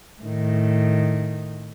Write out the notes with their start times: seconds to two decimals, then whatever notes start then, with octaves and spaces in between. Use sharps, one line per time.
0.22 A2 D#3